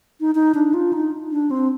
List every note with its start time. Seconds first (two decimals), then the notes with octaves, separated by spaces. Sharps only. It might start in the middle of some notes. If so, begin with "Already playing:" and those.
0.20 D#4
0.35 D#4
0.54 D4
0.74 F4
0.93 D#4
1.32 D4
1.51 C4